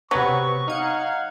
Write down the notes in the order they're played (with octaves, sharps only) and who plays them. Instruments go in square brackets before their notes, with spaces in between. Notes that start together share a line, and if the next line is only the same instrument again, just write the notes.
[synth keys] C3 B3 [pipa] F#3 [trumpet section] C#6
[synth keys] D#4 G#6 C#7 [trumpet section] F5 F#5